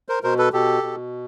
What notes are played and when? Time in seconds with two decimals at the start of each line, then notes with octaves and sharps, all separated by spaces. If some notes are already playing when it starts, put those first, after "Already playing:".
0.09 A#4 C5
0.23 B2 A#4 C5
0.38 A4 B4
0.53 B2 G4 A4
0.83 B2